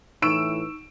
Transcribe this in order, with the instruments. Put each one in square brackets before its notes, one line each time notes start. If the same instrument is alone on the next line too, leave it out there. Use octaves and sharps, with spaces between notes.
[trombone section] A2 E3 [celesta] D#4 C#6 [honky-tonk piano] E6 D7 E7